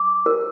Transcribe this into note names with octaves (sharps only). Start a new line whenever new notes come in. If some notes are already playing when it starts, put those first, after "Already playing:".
Already playing: D6
A#4